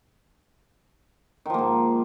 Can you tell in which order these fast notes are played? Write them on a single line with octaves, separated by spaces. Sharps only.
D#3 F3 A#3 G#2